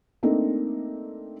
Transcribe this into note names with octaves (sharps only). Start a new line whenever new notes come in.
A3 A#3 C4 D4 D#4